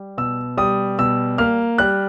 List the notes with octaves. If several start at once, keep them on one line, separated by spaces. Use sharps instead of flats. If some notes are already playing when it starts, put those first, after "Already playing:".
Already playing: G3
B2 E6
G3 D#6
B2 E6
A#3 F6
G3 F#6